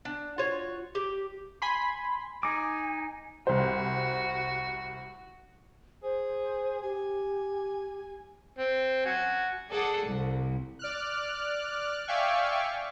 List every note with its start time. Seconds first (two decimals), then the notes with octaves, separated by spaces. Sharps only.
0.05 D4
0.38 F4 F#4 C#5
0.95 G4
1.62 G#5 B5 C6
2.43 D#4 G#5 D6
3.47 C2 F#4 C5
6.03 G#4 C5
6.82 G4 G#5
8.59 C4
9.06 F#4 G#5
9.70 G#4 A4 D5 F#5
10.07 C2
10.79 D5 F6 F#6
12.08 D5 E5 F5 G5 G#5 C#6